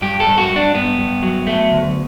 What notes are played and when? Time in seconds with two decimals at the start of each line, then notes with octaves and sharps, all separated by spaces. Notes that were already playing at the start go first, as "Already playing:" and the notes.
0.02 G2 G4
0.20 A4
0.26 G2
0.38 F#4
0.50 G2
0.56 D4
0.74 G2 B3
0.98 G2
1.23 F#3
1.47 A3
1.71 D2